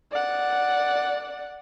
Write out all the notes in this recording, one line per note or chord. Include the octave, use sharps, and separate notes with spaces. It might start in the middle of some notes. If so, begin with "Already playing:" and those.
D5 F#5